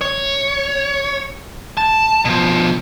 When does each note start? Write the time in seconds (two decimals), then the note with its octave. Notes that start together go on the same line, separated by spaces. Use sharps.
0.01 C#5
1.77 A5
2.25 B2 F3